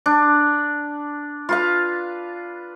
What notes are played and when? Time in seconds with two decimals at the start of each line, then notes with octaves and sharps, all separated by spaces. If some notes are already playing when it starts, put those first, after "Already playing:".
0.06 D4
1.49 F4 B4 F5